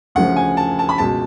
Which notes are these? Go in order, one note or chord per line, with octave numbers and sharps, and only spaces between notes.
D2 C#3 F3 F#5
G#5
A5
A5
B5
C#2 B2 A5